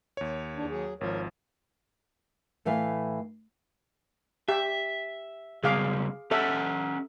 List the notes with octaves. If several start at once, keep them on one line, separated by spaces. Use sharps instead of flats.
D#2 C#5
E2 D4
F#3 G#4
G#1 F3 A#4 C#5
A2 E3 A3 B4 F5
G4 E5
C#3 F#3 G3 G#4 F5 D6
C#4 G4 A4 E5 F#5